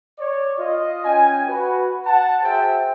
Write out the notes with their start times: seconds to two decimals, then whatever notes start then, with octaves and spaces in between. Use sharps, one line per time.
0.19 C#5 D5
0.59 F4 D#5
1.05 C#4 G5 G#5
1.47 F#4 B4
2.06 F#5 A5
2.44 F#4 G#4 C5 E5 G5